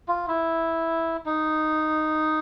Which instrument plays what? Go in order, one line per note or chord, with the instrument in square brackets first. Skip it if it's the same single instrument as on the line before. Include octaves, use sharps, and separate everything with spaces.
[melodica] F4
E4
D#4